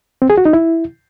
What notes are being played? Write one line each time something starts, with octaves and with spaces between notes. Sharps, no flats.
C4
G#4
F#4
D#4
E4